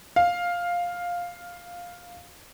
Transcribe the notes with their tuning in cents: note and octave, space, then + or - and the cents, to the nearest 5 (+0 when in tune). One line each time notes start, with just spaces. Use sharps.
F5 +5